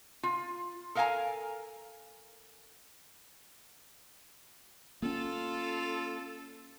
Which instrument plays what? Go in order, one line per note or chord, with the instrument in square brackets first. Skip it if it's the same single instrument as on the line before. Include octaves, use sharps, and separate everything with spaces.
[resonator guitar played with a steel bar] F4
A4 A#4 F5 F#5 G#5 A#5
[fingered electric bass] A#3 C#4 [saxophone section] F4 [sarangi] A4